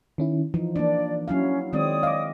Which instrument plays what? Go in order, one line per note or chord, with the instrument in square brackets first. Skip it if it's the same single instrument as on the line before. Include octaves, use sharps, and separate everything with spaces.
[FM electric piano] D#3 C#4 E4
[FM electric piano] E3 [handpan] F3 D#4
[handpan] A#3 D4 [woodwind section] D5
[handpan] F#3 E4 F5 [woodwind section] C#4
[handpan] D#3 G#3 C4 [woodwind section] C#5 D5 D#6
[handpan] D#5 [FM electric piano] F5 D6